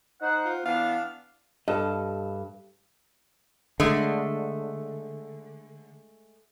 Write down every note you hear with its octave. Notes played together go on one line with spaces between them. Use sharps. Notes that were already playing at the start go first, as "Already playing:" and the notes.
D#4 C5 F#5
F4
E3 B3 D4 F5
G2 A4 D#5
D3 G#3 A3